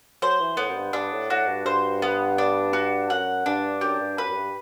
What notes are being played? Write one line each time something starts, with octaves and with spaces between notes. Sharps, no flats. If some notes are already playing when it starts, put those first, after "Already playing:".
F#3 C5
E3
A2 B3
F#2
G2
G2 D4
A2
A2 F#4
G2
G2 C5
B3
D4
F#4
F#2 F#5
G2 D4
F#2 G4
G2
F#2 B4
F#2
G2